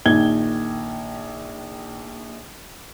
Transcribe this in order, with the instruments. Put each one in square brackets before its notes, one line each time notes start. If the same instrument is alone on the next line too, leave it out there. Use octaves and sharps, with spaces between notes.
[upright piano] A#1 D#3 G#6 G7